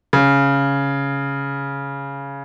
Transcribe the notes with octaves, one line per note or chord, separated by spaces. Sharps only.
C#3